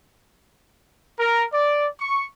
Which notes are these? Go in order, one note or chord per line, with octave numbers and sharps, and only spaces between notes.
A#4
D5
C#6